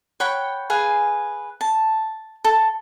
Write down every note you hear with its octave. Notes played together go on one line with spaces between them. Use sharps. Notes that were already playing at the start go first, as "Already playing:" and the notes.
C#5 F#5 G5 B5
G#4 B4 F5 G#5
A5
A4